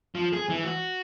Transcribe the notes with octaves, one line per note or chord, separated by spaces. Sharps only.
F3
G#4
E3
F#4